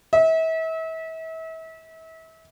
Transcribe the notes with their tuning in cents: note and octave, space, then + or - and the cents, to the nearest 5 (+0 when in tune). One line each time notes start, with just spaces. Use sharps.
E5 -35